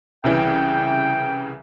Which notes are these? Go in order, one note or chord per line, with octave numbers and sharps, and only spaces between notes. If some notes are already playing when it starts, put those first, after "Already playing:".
C2 C#3 E3 G5